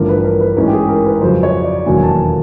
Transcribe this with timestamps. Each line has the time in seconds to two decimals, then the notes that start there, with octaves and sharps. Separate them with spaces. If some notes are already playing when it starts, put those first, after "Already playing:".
Already playing: A1 G2 D3 F3 A#4
0.09 B4
0.24 A#4
0.41 B4
0.56 A1 G#2 E3 G#3 C#4
0.67 G4
0.73 G#4
0.89 A#4
1.06 B4
1.22 F2 C#3 F#3 C5
1.43 C#5
1.64 D5
1.86 E1 D#2 D3 F#3 A#3 G#5
2.03 A5